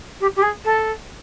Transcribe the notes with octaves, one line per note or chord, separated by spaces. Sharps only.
G4
G4
G#4
A4